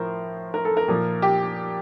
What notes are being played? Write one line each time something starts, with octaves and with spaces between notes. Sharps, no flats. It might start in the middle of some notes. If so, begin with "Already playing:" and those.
Already playing: A2 F3 A#4 C5
A#4
A4
A#4
A#2 F3
G4